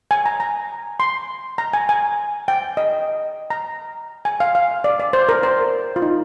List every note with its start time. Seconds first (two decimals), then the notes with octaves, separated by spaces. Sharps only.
0.11 G#5
0.26 A#5
0.40 A#5
1.00 C6
1.58 A#5
1.73 G#5
1.89 G#5
2.48 G5
2.77 D#5
3.50 A#5
4.25 G#5
4.40 F5
4.55 F5
4.84 D5
4.99 D5
5.13 C5
5.29 A#4
5.43 C5
5.96 F4
6.02 D#4